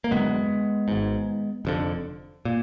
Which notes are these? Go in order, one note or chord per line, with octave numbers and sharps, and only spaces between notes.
A#3
F#1 F#2 D3 G#3 B3
G#1 G#2
F1 F2 D3
A#2